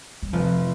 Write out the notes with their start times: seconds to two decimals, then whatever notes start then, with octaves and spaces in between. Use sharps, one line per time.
0.23 G3
0.33 F1 F3